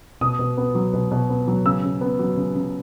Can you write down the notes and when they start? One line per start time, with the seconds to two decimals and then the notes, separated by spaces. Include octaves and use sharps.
0.21 B2 D#6
0.39 B2
0.57 B3
0.75 F#3
0.93 B2
1.11 B2
1.30 B3
1.48 F#3
1.66 C#3 E6
1.84 C#3
2.01 B3
2.19 F#3
2.37 C#3
2.55 C#3